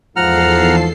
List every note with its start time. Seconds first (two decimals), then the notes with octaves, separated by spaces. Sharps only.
0.16 E2 G#2 F3 A4 F#5 A#5 F6 C7